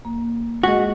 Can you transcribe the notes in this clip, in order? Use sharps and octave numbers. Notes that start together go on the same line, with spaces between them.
A#3
G#3 F#4 G#4 D#5